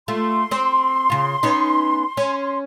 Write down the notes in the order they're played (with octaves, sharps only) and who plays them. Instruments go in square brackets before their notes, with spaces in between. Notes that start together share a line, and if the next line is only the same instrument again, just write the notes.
[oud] A3 F4 [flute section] C6
[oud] C4 C5
C#3 F4
B3 C#4 D#4
C#4